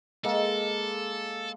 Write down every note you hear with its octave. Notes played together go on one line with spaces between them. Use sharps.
G#3 A#3 A4